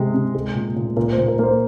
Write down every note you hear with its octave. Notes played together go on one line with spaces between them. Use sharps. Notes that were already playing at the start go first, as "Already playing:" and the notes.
Already playing: C3 G#3
C3
G#3
A#2
A#2
A#2 A#4
C5
A#2
A#4
A#3 C5